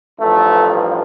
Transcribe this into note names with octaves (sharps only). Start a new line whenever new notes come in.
A1 G2 F3 A3